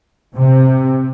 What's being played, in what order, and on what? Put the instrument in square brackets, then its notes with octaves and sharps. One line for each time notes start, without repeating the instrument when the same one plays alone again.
[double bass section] C3